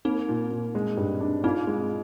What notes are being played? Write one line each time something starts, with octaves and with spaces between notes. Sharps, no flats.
A#3 C4 D#4
A#2
A#2
G#3
G2
D4
C4 D#4 F4
G#3